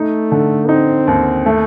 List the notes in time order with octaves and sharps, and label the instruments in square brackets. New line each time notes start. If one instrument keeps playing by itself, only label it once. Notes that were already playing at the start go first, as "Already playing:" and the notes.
Already playing: [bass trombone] A3 [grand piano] D#4
[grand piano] D3
[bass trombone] C4 [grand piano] D#4
[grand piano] D#2
A3